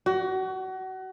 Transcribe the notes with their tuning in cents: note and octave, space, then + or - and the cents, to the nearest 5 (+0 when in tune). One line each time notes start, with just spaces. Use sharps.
F#4 +30